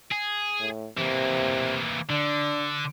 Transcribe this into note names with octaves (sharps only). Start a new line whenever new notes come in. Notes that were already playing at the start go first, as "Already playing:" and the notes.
G#4
A2
C3 E3 A#3
D3 D4